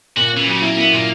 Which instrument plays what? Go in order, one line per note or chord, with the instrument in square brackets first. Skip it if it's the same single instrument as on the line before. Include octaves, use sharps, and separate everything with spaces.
[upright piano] A#2 [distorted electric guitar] F#4
[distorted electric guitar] E3 [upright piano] C#4
[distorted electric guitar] C#3 [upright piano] F#3
[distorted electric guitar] A#3 [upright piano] E4
[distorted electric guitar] B3 [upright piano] E4
[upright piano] A#2 [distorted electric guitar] A#3